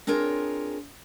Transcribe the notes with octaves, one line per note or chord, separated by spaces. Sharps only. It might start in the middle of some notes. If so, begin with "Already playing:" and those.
C4 D4 F4 G#4 A#4 C#5